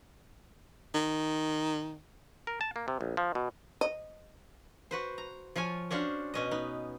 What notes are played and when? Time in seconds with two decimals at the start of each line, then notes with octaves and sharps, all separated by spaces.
0.95 D#3
2.47 A#4
2.61 A5
2.76 A#3
2.88 C3
3.01 A#1
3.17 F3
3.35 B2
3.81 D#5
4.91 F#4 B4 C5
5.18 A#5
5.56 F3 F4 C#5 G#5
5.91 C#4 D4 F#4 C5 F5
6.34 B2 C#4 D#5
6.51 B3 D#4